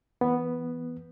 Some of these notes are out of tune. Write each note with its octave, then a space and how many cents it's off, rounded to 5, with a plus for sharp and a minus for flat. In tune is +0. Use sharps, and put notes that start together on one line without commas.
E3 +0 B3 +0